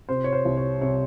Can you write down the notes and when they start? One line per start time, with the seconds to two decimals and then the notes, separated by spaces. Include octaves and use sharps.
0.09 C3 C5
0.24 C#5
0.33 C5
0.45 C2
0.57 C#5
0.81 C3 C#5